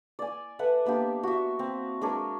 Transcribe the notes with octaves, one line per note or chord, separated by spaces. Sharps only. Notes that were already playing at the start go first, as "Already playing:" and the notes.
D5 G#5
A4 B4 E5 F#5
A#3 B3 D4 G4
F#4 E5
C4
G#3 D4 A#4 C#5